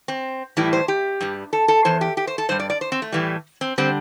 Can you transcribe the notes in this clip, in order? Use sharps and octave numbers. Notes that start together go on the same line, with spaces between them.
C4
A2 E3 G3 E4
C5
G4
G2 G3
A4
A4
E2 E3 C5
G4
G4
C5
A4
G2 G3 C5
D5
D5
C5
C4
A3
A2 E3 G3
C4
D3 G3 C4